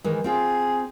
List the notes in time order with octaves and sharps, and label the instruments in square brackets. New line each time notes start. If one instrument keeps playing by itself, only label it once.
[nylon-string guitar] D#3 E3 G#3
[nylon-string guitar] C4 F4 D5 [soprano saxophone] G#4